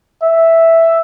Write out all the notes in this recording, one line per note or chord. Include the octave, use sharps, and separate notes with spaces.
E5